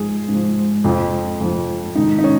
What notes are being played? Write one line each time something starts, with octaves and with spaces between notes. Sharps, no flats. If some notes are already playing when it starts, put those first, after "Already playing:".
Already playing: G#2 F3 G#4
G#2
F3
F2 F3
F2 F3
G#2 D#3 D#4
D#4
C#4